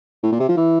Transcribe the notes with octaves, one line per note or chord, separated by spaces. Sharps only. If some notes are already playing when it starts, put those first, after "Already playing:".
A2
A#2
C3
F3
E3